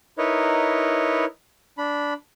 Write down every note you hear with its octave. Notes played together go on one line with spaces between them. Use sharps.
D#4 E4 A#4 B4 C#5 D#5
D4 B5